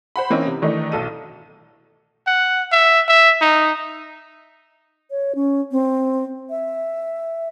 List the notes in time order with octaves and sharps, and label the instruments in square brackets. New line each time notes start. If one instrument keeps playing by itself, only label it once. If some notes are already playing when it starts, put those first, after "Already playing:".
[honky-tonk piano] C5 F#5 B5
E3 A#3 C4 C#4 D#4 E4
C3
D#3 E3 A3 D4 D#4
B1 A4 D#7
[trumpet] F#5
E5
E5
D#4
[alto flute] C#5
C#4
C4
E5